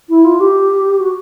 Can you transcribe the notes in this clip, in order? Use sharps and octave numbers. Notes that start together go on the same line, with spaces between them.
E4
F4
G4
F#4